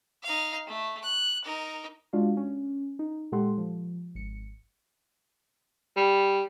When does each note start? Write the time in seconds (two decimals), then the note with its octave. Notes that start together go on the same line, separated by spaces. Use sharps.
0.23 D#4 F5
0.67 A3
1.03 F#6
1.45 D#4 A#4
2.13 G#3 D4 F4 F#4 D5 F5
2.37 C#4
2.99 D#4
3.32 A#2 G#3 G4 A4 F#5 C6
3.58 F3
4.15 G#1 C#7
5.97 G3